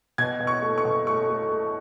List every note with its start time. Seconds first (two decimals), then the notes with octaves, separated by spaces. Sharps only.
0.18 B2 G#6
0.40 B2
0.47 C#6
0.62 A3
0.78 C#6
0.85 B2
1.07 A3 C#6
1.30 A3
1.52 A3